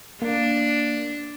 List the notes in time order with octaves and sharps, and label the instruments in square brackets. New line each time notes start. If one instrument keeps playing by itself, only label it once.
[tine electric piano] A#3 [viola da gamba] D4